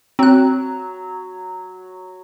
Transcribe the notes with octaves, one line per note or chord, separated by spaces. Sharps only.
F#3 C4 F#6